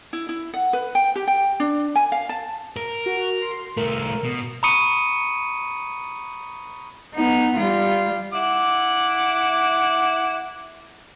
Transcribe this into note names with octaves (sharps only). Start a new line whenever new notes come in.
E4
E4
F#5
B4
G5
G4
G5
D4
G#5
F5
A5
A#4
F#4
C6
C2 A3 A#4
B2
A#5 B5 C#6 D#6 C#7 D#7
B3 D#4
G3 F4
E4 F#5 D6